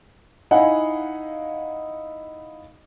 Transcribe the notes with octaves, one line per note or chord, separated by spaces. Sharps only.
D#4 E4 D#5 F5 F#5 G#5